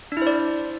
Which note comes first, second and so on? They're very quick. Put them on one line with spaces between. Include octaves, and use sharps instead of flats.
D4 E4 C5 D5